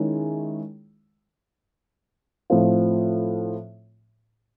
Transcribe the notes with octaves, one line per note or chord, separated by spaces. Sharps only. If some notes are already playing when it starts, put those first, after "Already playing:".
Already playing: D#3 G#3 C#4 E4
A2 F3 A3 C4 F4